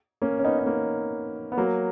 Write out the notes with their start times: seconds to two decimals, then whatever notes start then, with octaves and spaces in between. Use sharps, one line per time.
0.22 A#3 C#4
0.39 C#4
0.44 B3 D#4
0.59 D#4
0.66 A#3 C#4
1.52 B3
1.58 F#3 A#3